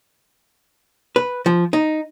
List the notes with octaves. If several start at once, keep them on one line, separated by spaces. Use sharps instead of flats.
B4
F3
D#4